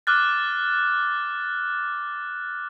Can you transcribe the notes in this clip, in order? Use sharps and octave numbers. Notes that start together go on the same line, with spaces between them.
D6 F6 F#6 A6